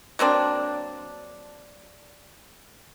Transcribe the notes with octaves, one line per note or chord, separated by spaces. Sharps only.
F#3 A#3 C4 D4